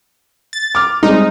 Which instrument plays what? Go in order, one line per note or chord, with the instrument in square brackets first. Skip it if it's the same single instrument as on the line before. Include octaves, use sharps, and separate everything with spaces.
[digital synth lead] A6
[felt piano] D6 F6
[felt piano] G3 G#3 C4 [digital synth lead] D#4